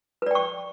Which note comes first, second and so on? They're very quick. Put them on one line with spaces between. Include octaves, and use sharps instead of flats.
B4 D5 G5 C#6